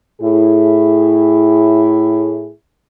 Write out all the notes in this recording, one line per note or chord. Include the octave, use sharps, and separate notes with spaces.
A2 E4 G#4